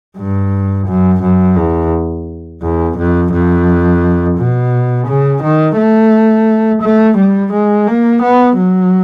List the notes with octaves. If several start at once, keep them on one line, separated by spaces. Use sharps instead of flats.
G2
F#2
F#2
E2
E2
F2
F2
B2
C#3
D#3
A3
A3
G3
G#3
A#3
B3
F#3